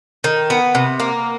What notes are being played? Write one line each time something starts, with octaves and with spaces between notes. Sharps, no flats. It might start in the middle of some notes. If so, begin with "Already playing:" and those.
D#3
B3
C3
A#3